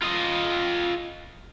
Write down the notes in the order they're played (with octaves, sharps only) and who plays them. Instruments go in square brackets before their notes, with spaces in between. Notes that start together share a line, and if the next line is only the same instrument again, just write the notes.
[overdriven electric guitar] F4 D#5